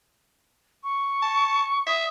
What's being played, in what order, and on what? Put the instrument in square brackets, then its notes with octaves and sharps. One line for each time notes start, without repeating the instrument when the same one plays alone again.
[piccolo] C#6
[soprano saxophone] A5
[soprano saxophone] E5 [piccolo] D#6